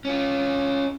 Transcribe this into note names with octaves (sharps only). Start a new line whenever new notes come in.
C#4 F4